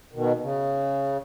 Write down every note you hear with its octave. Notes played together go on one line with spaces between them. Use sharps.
B2 D#3
C#3